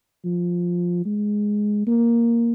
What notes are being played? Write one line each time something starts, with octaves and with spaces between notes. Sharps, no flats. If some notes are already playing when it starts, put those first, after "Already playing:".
F3
G#3
A#3